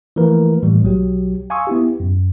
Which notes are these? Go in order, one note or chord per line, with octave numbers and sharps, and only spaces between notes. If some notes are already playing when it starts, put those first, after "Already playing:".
E3 F3 A3 A#3 A#4 B4
A2 D#3 E3 G3 A#3
B1 F#3 G4
F5 G#5 C6 C#6 D#6 E6
B3 E4 G4
F#2